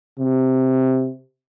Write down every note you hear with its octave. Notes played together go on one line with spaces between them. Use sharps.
C3